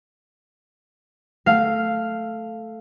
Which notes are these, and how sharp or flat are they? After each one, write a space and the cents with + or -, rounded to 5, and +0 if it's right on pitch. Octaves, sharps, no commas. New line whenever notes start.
A3 +0 F5 -5